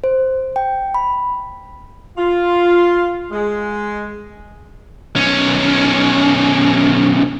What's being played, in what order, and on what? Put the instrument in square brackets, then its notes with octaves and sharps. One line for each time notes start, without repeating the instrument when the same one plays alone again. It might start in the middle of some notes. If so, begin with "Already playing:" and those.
[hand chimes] C5
G5
B5
[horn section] F4
G#3
[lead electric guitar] B1 C#4